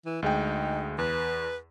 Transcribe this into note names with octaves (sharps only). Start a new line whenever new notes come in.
E3
D2 G#3 D#4 G5
E2 B4